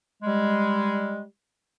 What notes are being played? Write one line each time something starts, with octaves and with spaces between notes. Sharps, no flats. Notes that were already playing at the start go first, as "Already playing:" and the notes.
G3 G#3